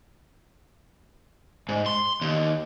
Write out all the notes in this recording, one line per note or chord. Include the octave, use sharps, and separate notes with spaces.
G#2
C6
D#2